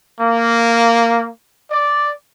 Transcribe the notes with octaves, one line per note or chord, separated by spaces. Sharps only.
A#3
D5